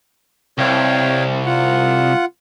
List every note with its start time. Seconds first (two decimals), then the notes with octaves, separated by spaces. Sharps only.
0.58 C2 C#5 F5 G5
1.46 F4 F#5